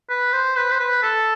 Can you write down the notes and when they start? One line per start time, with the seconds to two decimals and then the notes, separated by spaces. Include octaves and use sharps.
0.10 B4
0.33 C5
0.57 B4
0.71 C5
0.80 B4
1.03 A4